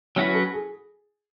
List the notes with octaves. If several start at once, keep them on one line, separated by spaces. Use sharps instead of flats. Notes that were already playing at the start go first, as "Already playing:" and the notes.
F#3 C#4 E4 F#4 B4
A4
G#4